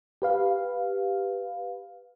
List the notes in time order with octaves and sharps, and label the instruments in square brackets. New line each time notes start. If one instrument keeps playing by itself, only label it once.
[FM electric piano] G4 B4 F5